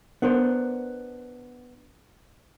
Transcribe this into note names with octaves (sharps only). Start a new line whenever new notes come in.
B3 D4 A#4 C5